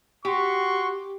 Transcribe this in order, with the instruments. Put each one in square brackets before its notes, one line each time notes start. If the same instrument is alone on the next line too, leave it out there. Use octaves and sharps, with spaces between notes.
[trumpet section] F#4 C6 C#6 [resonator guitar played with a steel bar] G4